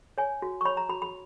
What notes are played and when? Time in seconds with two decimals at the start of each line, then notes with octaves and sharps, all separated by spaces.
0.18 C#5 G#5
0.42 F#4
0.61 C#6
0.65 C#5 B5
0.77 A#5
0.89 F#4 B5
1.02 B5